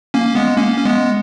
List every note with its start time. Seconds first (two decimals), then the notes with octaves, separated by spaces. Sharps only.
0.14 A#3 C#4
0.35 G#3 B3
0.57 A#3 C#4
0.77 C#4
0.85 G#3 B3